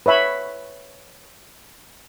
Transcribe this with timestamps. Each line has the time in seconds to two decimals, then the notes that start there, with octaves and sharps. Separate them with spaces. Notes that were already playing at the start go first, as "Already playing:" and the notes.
0.06 B4 C#5 E5 B5